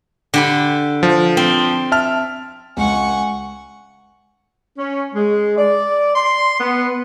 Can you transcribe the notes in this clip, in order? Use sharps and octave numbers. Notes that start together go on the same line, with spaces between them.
D3 G4 B5
F3
C4
E5 A5 F6
C#2 F#5 G#5 C#6
C#4
G#3
D5
C6
B3